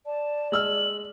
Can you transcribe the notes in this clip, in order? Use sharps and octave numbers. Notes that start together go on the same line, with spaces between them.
D5 A5
G#3 E6 F6 F#7